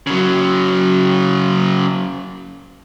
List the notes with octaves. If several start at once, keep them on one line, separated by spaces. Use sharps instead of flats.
C#3 F#3